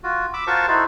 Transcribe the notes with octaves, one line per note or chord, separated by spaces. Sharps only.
F4 F#4
B5 D6 E6
F4 F#4 A#4 C5 A5 C#6
D#4 E4 F#4 A4 C5